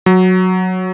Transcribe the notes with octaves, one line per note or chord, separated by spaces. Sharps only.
F#3